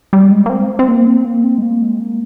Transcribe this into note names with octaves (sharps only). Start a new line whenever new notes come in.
G3
G#3
A#3
C4
C4
A#3
C4
A#3
C4
G#3
A#3
G#3
A#3